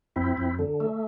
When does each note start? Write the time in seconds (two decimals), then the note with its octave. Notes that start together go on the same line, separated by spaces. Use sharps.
0.16 F2 C4 E4
0.37 F2
0.59 D3
0.80 A3